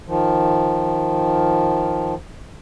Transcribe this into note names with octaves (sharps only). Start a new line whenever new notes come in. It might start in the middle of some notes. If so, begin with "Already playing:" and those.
D#3 F3